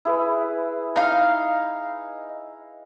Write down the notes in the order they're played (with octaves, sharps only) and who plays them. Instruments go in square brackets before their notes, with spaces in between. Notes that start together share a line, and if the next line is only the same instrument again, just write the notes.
[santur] E4 G#4 B4
[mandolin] D#4 F5